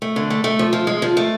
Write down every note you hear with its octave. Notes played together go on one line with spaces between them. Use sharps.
A3
D3
A3
A3
F3
F3
G#3
F3
A3